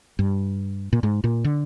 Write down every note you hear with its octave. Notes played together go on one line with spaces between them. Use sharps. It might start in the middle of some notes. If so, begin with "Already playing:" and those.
G2
A#2
G#2
A#2
D3